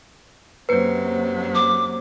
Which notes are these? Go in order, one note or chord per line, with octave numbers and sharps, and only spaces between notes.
F#2 C3 F#3 A#3 B4 C5
D6